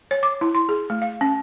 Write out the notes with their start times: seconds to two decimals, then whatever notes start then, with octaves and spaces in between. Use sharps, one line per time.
0.11 C#5
0.23 D6
0.41 E4
0.55 C6
0.69 G#4
0.90 A3
1.02 F5
1.21 C#4